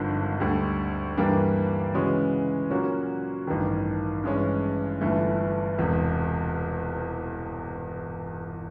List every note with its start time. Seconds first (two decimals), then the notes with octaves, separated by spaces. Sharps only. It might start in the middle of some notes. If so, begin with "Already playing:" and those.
Already playing: G#1 G2 D3 F3
0.40 D2 D3 G3
1.17 G2 E3 G3 A#3 D4
1.94 C#3 E3 G#3 C#4 F#4
2.71 A#2 F#3 A#3 C#4 F#4
3.47 A1 G2 D#3
4.24 G2 E3 G#3 C#4
5.01 G1 G2 E3 A3
5.78 E1 E2 C3